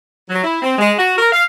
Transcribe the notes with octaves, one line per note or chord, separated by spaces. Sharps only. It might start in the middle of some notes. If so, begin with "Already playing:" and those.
F#3
E4
C4
G#3
F#4
A#4
F5